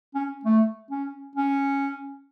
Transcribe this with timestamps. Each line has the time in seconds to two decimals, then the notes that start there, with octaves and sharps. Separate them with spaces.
0.15 C#4
0.45 A3
0.91 C#4
1.36 C#4